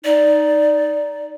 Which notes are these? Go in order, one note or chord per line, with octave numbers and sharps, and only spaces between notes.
D#4 D5